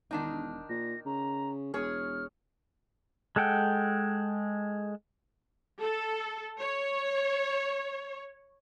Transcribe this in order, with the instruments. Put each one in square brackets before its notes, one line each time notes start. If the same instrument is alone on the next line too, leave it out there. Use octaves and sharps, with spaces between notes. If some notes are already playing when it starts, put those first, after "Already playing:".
[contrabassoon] E1 [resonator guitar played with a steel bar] D#3 D4 D#4
[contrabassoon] A#2 [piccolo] A#6
[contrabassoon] C#3 [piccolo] A#5
[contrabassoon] E1 [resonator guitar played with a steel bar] G#4 C#5 [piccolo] F6
[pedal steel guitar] G#3 A4 F#5 G5
[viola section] A4
C#5